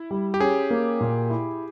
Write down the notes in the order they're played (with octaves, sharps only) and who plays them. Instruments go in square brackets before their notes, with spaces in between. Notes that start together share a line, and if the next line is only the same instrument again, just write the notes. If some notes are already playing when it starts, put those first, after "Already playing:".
Already playing: [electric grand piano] E4
[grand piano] G3
[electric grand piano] G4
[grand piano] C#4 [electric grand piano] G#4
[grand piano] A#3
A#2
E4